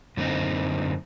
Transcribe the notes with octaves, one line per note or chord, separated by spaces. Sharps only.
F#2 D3 A#3 C4 D#4